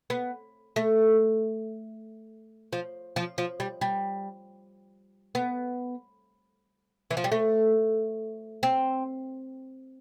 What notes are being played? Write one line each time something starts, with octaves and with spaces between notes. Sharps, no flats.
B3
A3
F3
F3
F3
G3
G3
B3
E3
F3
G3
A3
C4